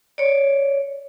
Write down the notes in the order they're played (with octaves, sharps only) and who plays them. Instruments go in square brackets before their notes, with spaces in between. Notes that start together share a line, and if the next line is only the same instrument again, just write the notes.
[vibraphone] C#5 D5